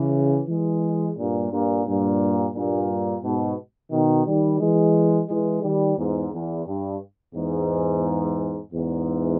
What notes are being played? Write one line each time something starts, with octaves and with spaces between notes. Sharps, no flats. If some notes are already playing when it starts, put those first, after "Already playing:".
Already playing: C#3 E3
E3 G#3
G2 A#2
G2 A#2
G2 A#2
G2 A#2
G#2 B2
B2 D#3
D#3 G3
E3 G#3
E3 G#3
D#3 G3
E2 G#2
E2
G2
E2 G#2
E2 G#2